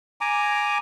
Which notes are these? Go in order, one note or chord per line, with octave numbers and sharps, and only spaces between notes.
G#5 A#5 D6